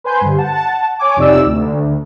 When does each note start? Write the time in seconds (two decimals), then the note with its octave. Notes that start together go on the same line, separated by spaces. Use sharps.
0.04 B4 C5 G#5 C6 G6
0.21 G2 D3
0.38 F#5 A5
0.99 C#5 G#5 D6
1.17 F2 C3 D#4 D5 E6
1.45 D2